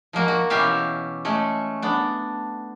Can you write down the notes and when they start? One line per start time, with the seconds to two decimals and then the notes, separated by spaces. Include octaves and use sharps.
0.13 F3 G#3 A#3 F#4
0.28 F#4
0.50 B2 E3 C#4 G4 E5 F5
1.25 G#3 A3 C#4
1.82 B3 D4